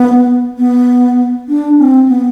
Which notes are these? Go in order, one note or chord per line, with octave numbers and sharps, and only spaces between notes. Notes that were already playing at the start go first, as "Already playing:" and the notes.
Already playing: B3
B3
D4
C4
B3